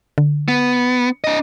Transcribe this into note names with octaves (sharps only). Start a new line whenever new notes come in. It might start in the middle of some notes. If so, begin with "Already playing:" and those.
D3
B3
D4 D#5